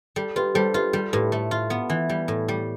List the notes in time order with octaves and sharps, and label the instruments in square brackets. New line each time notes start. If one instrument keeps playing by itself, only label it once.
[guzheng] G3 [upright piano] A4
[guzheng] F4 [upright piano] G4 B4
[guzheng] G3 [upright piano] A4 C5
[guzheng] F4 [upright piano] G4 B4
[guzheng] G3 [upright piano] A4
[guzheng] A2 [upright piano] G4 B4
[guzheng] A3
F4
B3
E3
G3
A2
G3